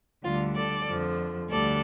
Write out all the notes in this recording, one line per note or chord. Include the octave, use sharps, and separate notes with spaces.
D2 D3 G3 F4
A4 D5
F2 D3 F3
D2 D3 G3 A4 D5